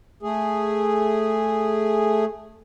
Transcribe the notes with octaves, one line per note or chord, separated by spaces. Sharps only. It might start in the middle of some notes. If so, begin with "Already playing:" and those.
A3 G#4